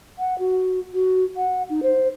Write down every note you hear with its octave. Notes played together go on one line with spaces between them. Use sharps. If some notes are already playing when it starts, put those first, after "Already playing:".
F#5
F#4
F#4
F#5
D#4
C5